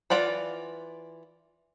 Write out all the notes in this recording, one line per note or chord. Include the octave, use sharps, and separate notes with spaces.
E3 F4 D5 F#5 B5